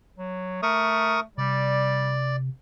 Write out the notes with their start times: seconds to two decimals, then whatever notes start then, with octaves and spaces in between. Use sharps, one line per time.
0.18 F#3
0.63 A3 A#4 C#6 D#6
1.38 C3 G3 D5